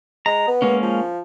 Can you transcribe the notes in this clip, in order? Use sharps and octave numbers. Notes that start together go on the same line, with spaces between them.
G#3 A#5
B3
G#3 A#3 C#4
F3